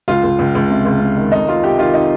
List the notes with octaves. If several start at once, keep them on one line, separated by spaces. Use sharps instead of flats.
C#2 F4
C#2
C#2
C#2
C3
C#2
C3
D#3
F2 D#4
F2 F4
C3 G4
D#3 F4
D#4